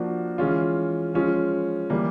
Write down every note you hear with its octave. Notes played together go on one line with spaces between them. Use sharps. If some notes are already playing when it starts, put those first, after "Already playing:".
Already playing: F3 A#3 D4 F#4
E3 G#3 C#4 F4
F3 G#3 C#4 F4
E3 G3 A#3